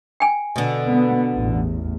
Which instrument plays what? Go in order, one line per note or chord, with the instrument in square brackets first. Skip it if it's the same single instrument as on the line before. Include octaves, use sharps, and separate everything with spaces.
[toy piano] G5 G#5
[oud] B2 D3
[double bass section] B3
A1 E2